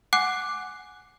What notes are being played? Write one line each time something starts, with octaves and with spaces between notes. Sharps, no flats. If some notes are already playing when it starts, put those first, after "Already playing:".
F#5 G#5 D6 F#6 C7